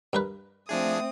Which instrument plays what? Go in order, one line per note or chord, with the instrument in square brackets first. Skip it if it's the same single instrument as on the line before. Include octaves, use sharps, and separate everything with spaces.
[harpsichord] G2 A#4 B4
[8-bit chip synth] F3 D4 G#4 [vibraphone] A3 E5 [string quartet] C4 D#6